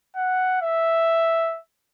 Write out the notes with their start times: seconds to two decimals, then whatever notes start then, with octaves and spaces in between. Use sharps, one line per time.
0.16 F#5
0.62 E5